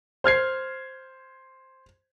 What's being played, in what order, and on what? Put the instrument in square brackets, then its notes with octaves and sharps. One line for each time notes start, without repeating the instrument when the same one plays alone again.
[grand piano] C5 F6 G#6 C7